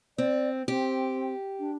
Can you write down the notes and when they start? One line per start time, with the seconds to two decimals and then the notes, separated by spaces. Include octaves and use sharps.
0.18 C4 D5
0.68 C4 G4
1.59 D4